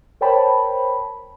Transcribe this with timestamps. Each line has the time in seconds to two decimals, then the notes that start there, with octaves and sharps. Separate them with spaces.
0.21 A#4 C5 C#5 G5 A5 B5